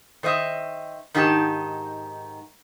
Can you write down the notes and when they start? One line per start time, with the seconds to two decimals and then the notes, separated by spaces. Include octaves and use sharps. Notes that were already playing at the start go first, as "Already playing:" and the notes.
0.23 D#3 C5 D#5 E5
1.15 G#2 D#3 D#4 G4 A4 A5